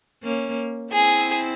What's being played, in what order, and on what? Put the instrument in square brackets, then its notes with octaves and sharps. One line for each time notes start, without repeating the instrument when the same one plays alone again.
[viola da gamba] A#3 C#4
[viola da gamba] C4 E4 [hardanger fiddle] G#4